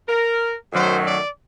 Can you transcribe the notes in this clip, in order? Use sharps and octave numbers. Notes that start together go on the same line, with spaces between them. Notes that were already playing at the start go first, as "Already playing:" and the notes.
A#4
F#2 D#3 F#3 A3 C5
D5